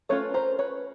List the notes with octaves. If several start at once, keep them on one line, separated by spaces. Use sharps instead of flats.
A3 C#4 F4 B4 C#5
A#4 C5
B4 C#5